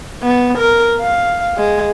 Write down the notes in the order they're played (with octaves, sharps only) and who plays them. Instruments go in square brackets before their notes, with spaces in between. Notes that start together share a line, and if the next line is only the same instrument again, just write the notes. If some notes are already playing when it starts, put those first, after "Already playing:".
[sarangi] B3
A#4
F5
G#3